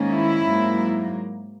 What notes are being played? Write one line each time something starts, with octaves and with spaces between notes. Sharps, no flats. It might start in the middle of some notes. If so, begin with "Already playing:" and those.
Already playing: G#2 D#3 A#3 C#4
E4
G#2 F#3 A#3